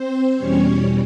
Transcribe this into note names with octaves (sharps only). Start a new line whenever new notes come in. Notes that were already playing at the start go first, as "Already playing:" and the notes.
Already playing: C4 C5
E2 B2 G3 C#4 C#5